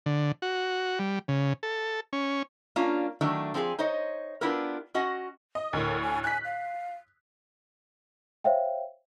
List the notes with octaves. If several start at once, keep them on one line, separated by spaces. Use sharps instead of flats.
D3
F#4
G3
C#3
A4
C#4
A#3 C#4 D4 F4
D#3 F#3 A3 D4 E4
F3 C4 G4 G#4 G#5
D#4 C5 C#5 D#5
B3 D4 E4 F4 G4 A#4
C#4 F#4 D#5 F#5
D#5
D2 A2 A#4
G#5
G#5 F#6 B6
F5
C5 C#5 E5 F5 G5